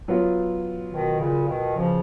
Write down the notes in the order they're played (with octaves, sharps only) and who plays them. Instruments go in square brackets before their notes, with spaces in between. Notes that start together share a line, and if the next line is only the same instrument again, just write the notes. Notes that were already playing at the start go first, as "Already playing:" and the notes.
[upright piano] F#3 B3 F4
[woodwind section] B2 D#3
A#2 C#3
B2 D#3
C#3 F3